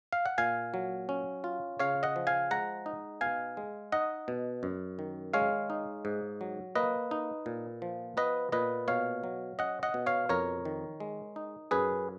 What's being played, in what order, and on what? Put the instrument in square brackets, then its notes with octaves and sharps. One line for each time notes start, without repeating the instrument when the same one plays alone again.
[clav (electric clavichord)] F5
F#5
A#2 F5 G#5
F#3
C#4
F4
C#3 C#5 F5
D#5 F#5
F3
F5 G#5
G#3 F#5 A#5
D#4
B2 F5 G#5
G#3
D#4 D#5 F#5
B2
F#2
D#3
G#3 C#5 F5
D#4
G#2
F#3
A#3 B4 D#5
D#4
A#2
F3
B3 B4 D#5
A#2 B4 D#5
B2 C#5 F5
F#3
C#4 D#5 F#5
D#5 F#5
B2
C#5 F5
F2 A#4 C#5
D#3
G#3
D#4
F#2 G#4 B4